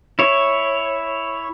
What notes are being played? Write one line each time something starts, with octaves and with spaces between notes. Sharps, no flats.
E4 C#5